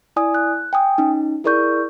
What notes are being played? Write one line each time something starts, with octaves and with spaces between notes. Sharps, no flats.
E4 D5 G#5 D#6
F#6
G5 G#5 D#6
C#4 D#4
E4 G#4 A#4 D5 C#6 G6